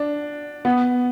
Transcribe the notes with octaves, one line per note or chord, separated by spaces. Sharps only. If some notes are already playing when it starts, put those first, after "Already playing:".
Already playing: D4
B3